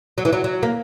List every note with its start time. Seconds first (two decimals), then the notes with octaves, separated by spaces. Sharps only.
0.18 F#3
0.25 E3
0.33 F#3
0.44 F#3
0.63 A#3